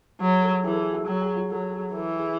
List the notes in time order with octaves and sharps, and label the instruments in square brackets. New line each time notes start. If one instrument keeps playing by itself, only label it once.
[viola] F#3 [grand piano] G#4
[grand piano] A4
[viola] E3 [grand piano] G#4
[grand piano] A4
G#4
F#4
[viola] F#3 [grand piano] G#4
[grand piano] G#4
F#4
[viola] F#3 [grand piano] A4
[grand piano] G#4
[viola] E3 [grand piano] A4
[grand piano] G#4